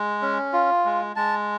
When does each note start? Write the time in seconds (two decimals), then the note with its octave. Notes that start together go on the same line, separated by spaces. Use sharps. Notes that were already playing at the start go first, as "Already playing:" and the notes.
Already playing: G#3
0.22 C#4
0.53 F4
0.85 G#3
1.16 G#3 A5